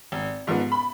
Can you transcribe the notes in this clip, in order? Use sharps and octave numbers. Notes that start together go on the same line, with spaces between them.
G#1
G#2 F3 B3
B5